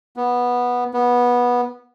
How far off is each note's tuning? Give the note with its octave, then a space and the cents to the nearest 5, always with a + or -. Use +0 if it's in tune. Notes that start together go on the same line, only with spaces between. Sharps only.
B3 -10
B3 -15